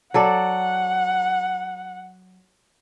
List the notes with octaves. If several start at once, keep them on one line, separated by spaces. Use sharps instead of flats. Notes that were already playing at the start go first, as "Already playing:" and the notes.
F#3 A4 D5 F#5